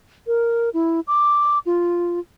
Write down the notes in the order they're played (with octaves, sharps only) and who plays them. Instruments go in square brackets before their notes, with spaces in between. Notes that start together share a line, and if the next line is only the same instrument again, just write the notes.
[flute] A#4
E4
D6
F4